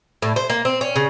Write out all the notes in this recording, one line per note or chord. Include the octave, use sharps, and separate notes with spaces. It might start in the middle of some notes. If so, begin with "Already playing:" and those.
A2
C5
A#3
C4
C#4
C#3